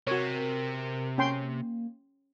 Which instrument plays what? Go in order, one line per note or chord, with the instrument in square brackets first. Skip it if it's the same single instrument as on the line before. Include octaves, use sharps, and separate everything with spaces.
[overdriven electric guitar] C3 [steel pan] F#4 C#5 [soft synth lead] A#4
[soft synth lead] A#3 [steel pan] C#4 G5 C6